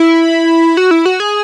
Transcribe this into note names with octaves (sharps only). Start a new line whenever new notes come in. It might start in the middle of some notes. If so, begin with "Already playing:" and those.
Already playing: E4
F#4
E4
F#4
G#4